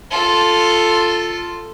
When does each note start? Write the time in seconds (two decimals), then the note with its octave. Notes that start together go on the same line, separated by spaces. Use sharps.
0.10 F4 A4